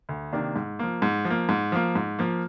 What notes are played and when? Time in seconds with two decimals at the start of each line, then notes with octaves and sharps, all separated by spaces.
0.09 D2
0.32 C3 D#3 A#3 D4
0.56 G#2
0.79 F3 A#3
1.02 G#2
1.25 F3
1.30 A#3
1.49 G#2
1.72 F3 A#3
1.95 G#2
2.19 F3 A#3